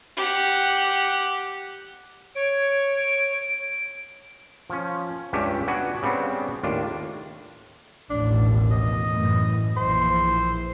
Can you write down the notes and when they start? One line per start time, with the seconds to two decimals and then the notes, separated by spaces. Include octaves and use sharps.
0.17 G4 F#5
2.35 C#5 D7
4.70 F3 C#4
5.33 C#2 G2 C#4 D4 G4 E5
5.67 B3 D4 F#4 G#5
6.03 C#3 G3 B3 C4 D4
6.63 D#2 A2 D4 F4
8.10 A1 D#2 B2 D4
8.71 D#5
9.10 F#2 A2 E3
9.77 A#1 E3 C5